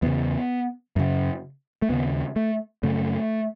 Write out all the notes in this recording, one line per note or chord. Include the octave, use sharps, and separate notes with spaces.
E2 C#3 B3
F#2 C#3
A3
D#2 C#3 B3
A3
F#2 C#3 A3